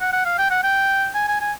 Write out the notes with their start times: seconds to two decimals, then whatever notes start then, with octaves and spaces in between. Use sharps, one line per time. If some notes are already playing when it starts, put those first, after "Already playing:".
0.01 F#5
0.13 F#5
0.25 F5
0.38 G5
0.51 F#5
0.63 G5
1.15 G#5
1.28 G#5
1.41 G#5